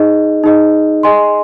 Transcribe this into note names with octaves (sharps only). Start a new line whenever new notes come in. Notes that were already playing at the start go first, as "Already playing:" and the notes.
Already playing: D#4 G#4 D#5
D#4 G#4 D#5
G#4 D#5 G#5 C6